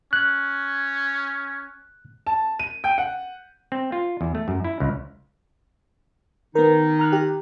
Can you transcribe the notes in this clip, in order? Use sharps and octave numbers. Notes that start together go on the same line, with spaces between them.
C#4 F#6
A5
D#7
G5
F#5
C4
F4
E2
A3
F#2
E4
C#2
D#3 B3 D#4 A#4
A#5 F6 F#6
G4